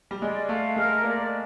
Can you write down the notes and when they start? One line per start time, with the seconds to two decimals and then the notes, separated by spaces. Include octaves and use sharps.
0.11 G3
0.21 G#3 D5
0.48 A3 F5
0.76 G#3 A#4
1.03 A#3 D5